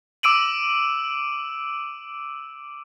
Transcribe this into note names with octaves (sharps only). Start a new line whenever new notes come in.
D6 E6 D7 D#7 F#7